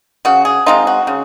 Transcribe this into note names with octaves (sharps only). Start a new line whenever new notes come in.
C#3 F#4
G#4
G#3 C4 D#4 F4
F#4
C#3